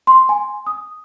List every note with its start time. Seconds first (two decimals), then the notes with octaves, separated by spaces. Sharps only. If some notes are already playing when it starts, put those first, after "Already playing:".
0.07 C6
0.29 G#5
0.67 D#6